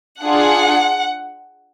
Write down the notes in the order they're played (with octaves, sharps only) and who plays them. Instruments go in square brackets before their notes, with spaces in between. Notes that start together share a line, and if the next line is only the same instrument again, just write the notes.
[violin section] D4 F4 G#4 F#5